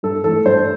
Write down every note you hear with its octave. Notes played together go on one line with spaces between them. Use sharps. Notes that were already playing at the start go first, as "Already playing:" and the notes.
G2 A4
E3 A3 A4
G2 C5